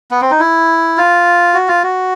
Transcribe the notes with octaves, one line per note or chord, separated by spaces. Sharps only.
B3
C4
D#4
E4
F4
F#4
F4
F#4